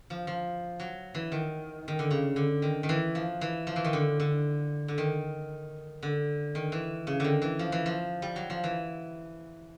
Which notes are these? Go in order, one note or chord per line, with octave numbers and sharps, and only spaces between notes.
F3
F3
F#3
E3
D#3
D#3
D3
C#3
D3
D#3
D#3
E3
F3
E3
F3
E3
D#3
D3
D3
D3
D#3
D3
D#3
E3
C#3
D3 D#3
E3
F3
E3
F3
G3
F#3
F3
E3